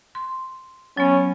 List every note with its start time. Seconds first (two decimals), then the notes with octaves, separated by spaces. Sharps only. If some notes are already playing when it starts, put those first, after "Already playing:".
0.15 C6
0.97 F#3 B3 C#4